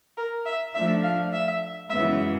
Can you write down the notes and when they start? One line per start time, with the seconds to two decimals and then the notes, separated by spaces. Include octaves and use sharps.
0.17 A#4
0.46 E5
0.75 F3 A3 D4 E5
1.03 F5
1.33 E5
1.90 F#2 C#3 E3 G#3 B3 E5